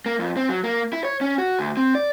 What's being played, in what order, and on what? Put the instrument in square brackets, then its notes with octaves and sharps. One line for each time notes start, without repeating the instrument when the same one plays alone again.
[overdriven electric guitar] A#3
F2
C4
F#3
A#3
E4
C#5
C#4
F#4
D2
C4
D5